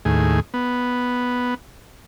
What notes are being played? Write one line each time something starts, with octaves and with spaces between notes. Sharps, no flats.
D#2 A2 G#4
B3